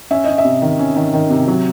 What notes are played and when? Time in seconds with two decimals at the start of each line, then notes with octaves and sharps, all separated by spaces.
0.11 C#4 E5
0.24 C#4 D#5
0.38 E5
0.45 C3
0.62 D#3
0.79 C#4
0.96 D#3
1.13 D#3
1.30 C3
1.48 F#3